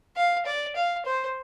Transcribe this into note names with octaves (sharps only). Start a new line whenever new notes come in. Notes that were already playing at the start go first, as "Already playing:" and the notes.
F5
D5
F5
C5